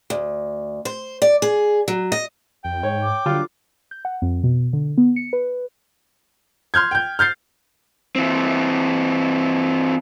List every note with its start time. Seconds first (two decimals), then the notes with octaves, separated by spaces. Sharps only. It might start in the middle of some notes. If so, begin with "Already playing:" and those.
0.10 D2
0.85 C5
1.22 D5
1.42 G#4
1.88 F#3
2.12 D#5
2.65 F2 G5
2.83 G#2 C#5
3.03 D6
3.26 D3 F#3 G3 F4
3.91 G6
4.05 F#5
4.22 F2
4.43 B2
4.73 D3
4.98 B3
5.16 C#7
5.33 B4
6.74 C6 F6 G6 G#6
6.91 G5 G6
7.19 F6 G6 A6 C7
8.16 E3 C4